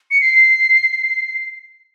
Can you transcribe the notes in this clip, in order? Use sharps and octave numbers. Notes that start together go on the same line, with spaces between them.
C#7
C7